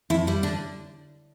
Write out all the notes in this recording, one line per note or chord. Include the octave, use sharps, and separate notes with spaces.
F2 E4
G3 E4
D3 D4